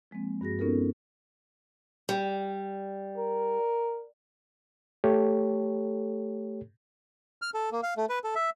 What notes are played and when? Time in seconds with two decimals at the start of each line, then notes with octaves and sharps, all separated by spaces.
0.11 F3 G#3 A#3 C4
0.41 G2 F#4 G#4 A#6
0.59 B3 C#4 D#4 F4 A4 A#4
2.09 G3
3.18 A#4
5.04 A3 G4 A4 C#5
7.42 F6
7.54 A4
7.72 A#3
7.83 F5
7.97 A3
8.09 B4
8.24 A4
8.35 E5